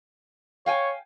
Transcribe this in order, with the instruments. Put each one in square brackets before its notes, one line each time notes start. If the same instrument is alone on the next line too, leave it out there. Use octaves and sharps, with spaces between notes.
[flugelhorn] C#5 [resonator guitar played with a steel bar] F5 G5 G#5